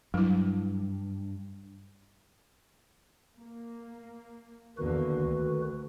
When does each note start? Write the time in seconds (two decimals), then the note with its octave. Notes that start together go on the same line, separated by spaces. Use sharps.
0.14 G2 F#3 E4
3.39 A#3
4.78 E2 D3 D#3 A#3 F#4 B4
5.23 D2